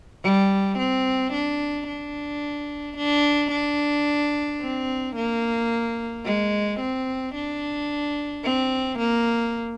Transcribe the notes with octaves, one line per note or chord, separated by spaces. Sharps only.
G3
C4
D4
D4
D4
D4
C4
A#3
G#3
C4
D4
C4
A#3